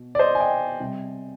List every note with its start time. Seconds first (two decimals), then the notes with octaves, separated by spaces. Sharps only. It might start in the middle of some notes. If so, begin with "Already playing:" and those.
Already playing: B2
0.15 D5
0.19 C5 D#5
0.35 G#5
0.40 D#5 G5
0.80 C3 G3